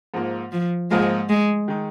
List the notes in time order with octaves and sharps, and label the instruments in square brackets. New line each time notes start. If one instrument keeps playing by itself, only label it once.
[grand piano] G#2 F3 A#3 F4
[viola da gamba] F3
[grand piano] G#2 F3 A#3 F4 [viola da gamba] G#3
[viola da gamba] G#3
[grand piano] D#3 G#3 D#4